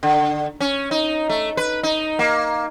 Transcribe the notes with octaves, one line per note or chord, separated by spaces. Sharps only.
D3
C#4
D#4
A3
B4
D#4
A#3